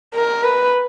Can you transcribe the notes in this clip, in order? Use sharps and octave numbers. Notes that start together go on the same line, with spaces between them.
A#4
B4